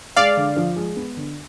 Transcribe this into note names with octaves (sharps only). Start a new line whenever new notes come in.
G#3 D5 F5
D3
F3
G#3
B3
D3